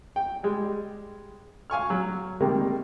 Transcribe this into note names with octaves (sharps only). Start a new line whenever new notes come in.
G5
G3 G#3
F5 G#5 C#6 F6
F#3
C3 D#3 G3 G#3 A#3